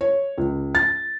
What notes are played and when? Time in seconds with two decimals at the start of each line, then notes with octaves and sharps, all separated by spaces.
0.01 C#5
0.38 C#2
0.75 A6